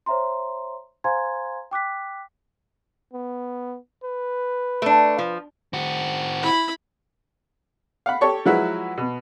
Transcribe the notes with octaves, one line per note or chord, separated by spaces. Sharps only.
C5 C#5 E5 A#5 C6
C5 F5 G#5 A#5 C6 G#6
G5 D6 F#6 B6
B3
B4
A3 D4
F3
C4 F#4
E4 B5
F5 F#5 B5
G4 A4 C#5 A5 C#6
F3 F#3 G#3 E4 F#4 B4
B2